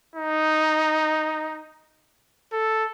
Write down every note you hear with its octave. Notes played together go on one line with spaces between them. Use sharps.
D#4
A4